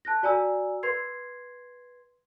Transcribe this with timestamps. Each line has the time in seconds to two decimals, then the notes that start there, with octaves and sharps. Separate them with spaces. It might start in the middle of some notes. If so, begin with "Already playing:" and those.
0.05 A5 F#6 A#6
0.23 F#4 D5 G#5 A#5 E6
0.83 B4 C6 G#6 C7